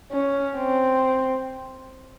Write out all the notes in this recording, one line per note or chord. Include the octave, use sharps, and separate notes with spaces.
C#4
C4